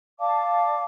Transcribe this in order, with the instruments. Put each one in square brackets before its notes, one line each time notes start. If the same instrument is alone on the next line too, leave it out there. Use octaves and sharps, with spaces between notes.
[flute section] D5 F5 A5 D6